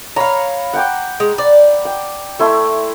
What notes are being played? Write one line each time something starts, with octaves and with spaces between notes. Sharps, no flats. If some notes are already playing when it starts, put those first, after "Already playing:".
C#5 F5 A#5 B5
F#5 G5 D6
G#3
D5
G5
A3 E4 C6